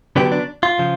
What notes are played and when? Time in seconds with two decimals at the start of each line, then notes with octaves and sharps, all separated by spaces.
0.16 D3 F#3 B3 D4 G4
0.32 D4
0.63 F4
0.79 C#3 F3